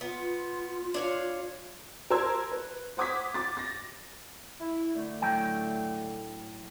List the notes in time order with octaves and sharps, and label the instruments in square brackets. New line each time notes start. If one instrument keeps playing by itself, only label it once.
[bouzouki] B3 [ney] F4
[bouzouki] D4 C#5 F5
[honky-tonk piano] A#4 C5 A5 C6 E6 G#6
B4
C5 F#5 D6 D#6 G#6 B6
D6 A6
A6 A#6
[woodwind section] E4
D3 A3
[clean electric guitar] A2 F#3 G5